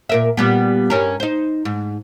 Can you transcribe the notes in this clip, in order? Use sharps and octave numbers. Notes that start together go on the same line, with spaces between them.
A#2 A#4 E5
A#2 G3 B3
G2 C#4 A#4
D#4 C5
G#2